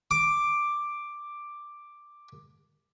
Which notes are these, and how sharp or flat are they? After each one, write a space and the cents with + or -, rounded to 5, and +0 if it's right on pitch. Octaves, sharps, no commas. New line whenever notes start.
D6 +5